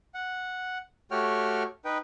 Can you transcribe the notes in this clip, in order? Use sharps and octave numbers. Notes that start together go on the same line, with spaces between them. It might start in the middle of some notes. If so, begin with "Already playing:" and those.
F#5
A3 F#4 G4 C#5 G5 F6
D#4 B4 G5